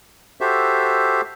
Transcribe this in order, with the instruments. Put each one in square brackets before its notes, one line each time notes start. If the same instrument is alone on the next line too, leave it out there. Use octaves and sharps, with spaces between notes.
[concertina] F#4 G4 A4 C5 E5